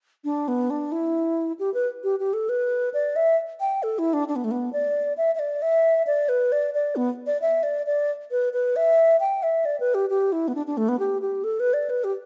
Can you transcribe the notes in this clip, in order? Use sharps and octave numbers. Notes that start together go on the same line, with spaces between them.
D4
B3
D4
E4
G4
B4
G4
G4
A4
B4
D5
E5
G5
A4
E4
D4
D4
B3
A3
B3
D5
E5
E5
D5
E5
D5
B4
D5
D5
B3
D5
E5
D5
D5
B4
B4
E5
G5
E5
D5
B4
G4
G4
E4
B3
D4
D4
A3
B3
G4
G4
A4
B4
D5
B4
G4